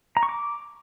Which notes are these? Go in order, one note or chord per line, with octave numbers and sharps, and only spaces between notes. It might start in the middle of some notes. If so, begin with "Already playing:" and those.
A#5
C#6
D6